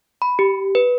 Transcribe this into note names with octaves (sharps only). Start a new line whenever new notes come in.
B5
G4
B4